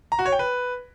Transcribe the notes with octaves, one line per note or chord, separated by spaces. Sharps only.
A#5
F#4
C#5
G5
B4